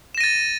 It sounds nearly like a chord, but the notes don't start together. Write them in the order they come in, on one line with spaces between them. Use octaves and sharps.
E7 A#6 D#7 A6